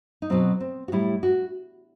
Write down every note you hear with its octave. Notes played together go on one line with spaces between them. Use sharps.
D#4
B2 F#3 C4
C4
F#4
A2 G3 E4
F#4